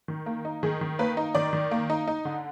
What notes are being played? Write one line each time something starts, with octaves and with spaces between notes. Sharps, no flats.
D#3
A#3
D#4
D#3 G#4
D#3
A#3 B4
D#4
D#3 D5
D#3
A#3
D#4
D#4
D3